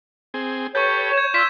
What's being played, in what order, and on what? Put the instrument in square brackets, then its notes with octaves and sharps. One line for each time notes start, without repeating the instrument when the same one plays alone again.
[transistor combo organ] C4 G#4
[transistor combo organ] G4 A4 B4 [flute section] C#5 [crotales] C#6 G6
[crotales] G#6 E7
[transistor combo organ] F4 D5 [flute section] C6 E6 [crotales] B6 E7